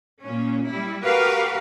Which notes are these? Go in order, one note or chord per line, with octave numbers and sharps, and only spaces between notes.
A#2 C#4
G3 E4
F#4 G4 A#4 B4 F5